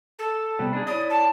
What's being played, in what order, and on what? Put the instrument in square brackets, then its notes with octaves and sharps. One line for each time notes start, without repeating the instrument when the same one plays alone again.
[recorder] A4
[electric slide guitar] C3 G3 B3
D4 D#4 G#4
[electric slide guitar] E4 C#5 D5 [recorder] D#6
[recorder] A5